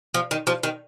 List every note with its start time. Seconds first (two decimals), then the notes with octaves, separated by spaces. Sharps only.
0.14 F3
0.31 D#3
0.47 F3
0.63 D#3